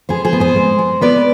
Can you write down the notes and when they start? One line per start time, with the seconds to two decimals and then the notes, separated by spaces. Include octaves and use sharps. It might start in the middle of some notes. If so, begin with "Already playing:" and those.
0.09 B3 G#4 C5
0.25 G#4 C5
0.33 B3
0.40 G#4 C5
0.56 G#3
0.79 G#3
1.01 B3 B4 D5